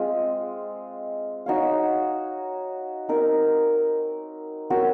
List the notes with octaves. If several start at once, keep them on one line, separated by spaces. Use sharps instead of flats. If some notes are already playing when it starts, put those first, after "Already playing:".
Already playing: G#3 C4 F4
D#4 F#4 C#5 F5
C4 D#4 A#4
C4 F#4 A#4 C#5